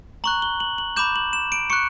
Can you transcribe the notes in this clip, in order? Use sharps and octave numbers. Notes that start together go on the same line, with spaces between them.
A#5 C#6 F#6 F#7
G7
F#7
F#7
B5 D6 G6 E7
F#7
E7
D7
C#6 F#6 C#7